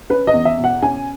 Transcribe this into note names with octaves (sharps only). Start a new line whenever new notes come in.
C#4 B4
D#5
E2
E5
B2
F#5
C#4 G#5